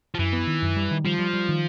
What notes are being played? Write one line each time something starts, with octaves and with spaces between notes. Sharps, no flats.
F3
F#2 E3
B3
D#3
F#2
G3
D#3
F3 G3
G3
G3
D#3